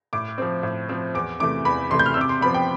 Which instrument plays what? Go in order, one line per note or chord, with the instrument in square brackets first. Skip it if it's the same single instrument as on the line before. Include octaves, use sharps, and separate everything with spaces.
[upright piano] A2 D6
F3 C4
A2
F3 C4
E2 D6
C3 E3 A3 D6
E2 B5
C3 E3 A3 C6
G6
F6
E6
C3 D6
C6
F3 B3 B5
G5